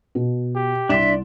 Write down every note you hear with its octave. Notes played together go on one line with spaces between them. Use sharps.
B2
G4
C2 D4 D5 E5 C6 E7